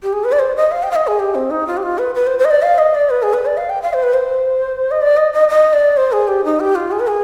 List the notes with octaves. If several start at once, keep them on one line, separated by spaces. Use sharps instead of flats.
G4
G#4
B4
D5
C5
D#5
F5
G5
F5
D#5
G#4
G4
C4
D#4
F4
G4
F4
B4
B4
C5
C5
D#5
D5
F5
D#5
D5
B4
G#4
B4
D5
F5
G5
F5
C5
B4
C5
D#5
D5
D#5
D#5
D#5
D5
C5
G#4
G4
D#4
G4
F4
G#4
B4
G#4